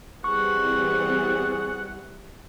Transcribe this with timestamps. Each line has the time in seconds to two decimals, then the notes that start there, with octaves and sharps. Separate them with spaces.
0.24 E3 G3 C4 G#4 F#5 C#6